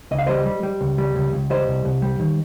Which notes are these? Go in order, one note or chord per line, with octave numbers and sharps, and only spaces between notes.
C#2 D#5
F5
G3 C5 D#5
G3
G3
C#2
G3
C#2
C#2
G3 C5 D#5
C2
C2
G3
D#3